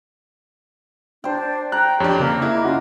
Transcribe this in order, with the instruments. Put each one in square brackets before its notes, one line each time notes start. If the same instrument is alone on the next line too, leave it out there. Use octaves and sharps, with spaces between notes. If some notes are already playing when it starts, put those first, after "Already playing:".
[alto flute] D4 [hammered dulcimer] C5 G5
[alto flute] G5 [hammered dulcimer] A#5 [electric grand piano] F#6
[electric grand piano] F2 D4 [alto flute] G4 [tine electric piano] C#5
[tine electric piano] C#3 [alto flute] A#3
[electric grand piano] E4 [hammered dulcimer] D#5
[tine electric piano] C#4 F#4 F#5 [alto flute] F4